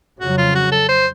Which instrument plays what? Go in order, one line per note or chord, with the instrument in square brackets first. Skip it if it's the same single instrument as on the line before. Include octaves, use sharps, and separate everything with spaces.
[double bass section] F2 C#3 F#3 [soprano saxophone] F#4
[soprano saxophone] F4
F#4
A4
C5